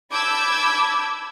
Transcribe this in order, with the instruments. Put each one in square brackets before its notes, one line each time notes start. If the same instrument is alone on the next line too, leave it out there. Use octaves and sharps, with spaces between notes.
[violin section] A5 B5 D6 E6 G6 G#6